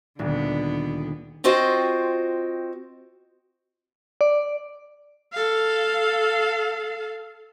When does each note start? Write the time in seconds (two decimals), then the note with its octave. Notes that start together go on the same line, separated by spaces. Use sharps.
0.19 D#1 D2 D3 B3
1.44 C4 F4 F#4 C5 D#5 G5
4.21 D5
5.33 A4 F5